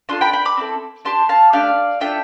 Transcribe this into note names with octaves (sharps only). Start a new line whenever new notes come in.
D4 F4 A4 A5 C6
G5 B5
G5 B5
B5 D6
C4 E4 A4
D4 G4 A5 C6
F5 A5
A3 D4 G4 D5 F5
D4 F4 A4 E5 G5